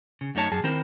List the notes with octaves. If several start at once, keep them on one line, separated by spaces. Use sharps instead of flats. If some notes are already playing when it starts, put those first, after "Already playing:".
C#3
F#2 A3 D#4 C#5 A5
F#2 G#4 A5
D#3 C4 E4 A#4 C5